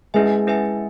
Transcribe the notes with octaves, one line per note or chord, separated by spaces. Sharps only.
G#3 C#4 E4 B4 E5 G#5
C#4 E4 B4 E5 G#5